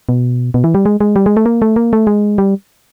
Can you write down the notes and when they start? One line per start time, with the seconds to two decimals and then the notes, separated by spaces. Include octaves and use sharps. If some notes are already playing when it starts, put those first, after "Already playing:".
0.09 B2
0.54 B2
0.64 E3
0.75 G3
0.86 G#3
1.00 G#3
1.16 G3
1.26 G#3
1.37 A3
1.46 A#3
1.62 A3
1.76 A#3
1.93 A3
2.07 G#3
2.38 G3